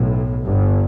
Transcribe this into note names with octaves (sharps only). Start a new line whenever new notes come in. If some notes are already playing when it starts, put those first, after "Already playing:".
Already playing: B1 A2
G1 G2